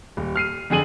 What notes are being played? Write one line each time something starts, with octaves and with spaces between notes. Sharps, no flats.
D#1
F6 C7 D#7
F2 D3 G#4 D#7 F#7